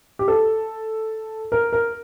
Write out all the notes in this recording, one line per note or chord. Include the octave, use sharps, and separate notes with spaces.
G4
A4
A#4
A#4